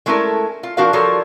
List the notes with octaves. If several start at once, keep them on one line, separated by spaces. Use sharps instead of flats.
G#3 A3 C#4 E4 A4 A#4
F4
F3 D4 F#4 A#4 F5
F3 G3 F4 A4 A#4 C#5